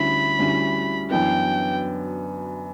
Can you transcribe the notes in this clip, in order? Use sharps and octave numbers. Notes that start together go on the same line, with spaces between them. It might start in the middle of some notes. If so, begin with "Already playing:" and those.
Already playing: D2 D3 G3 C#4 E4 B5
D2 D3 G3 C#4 E4
F#2 E3 B3 D4 G5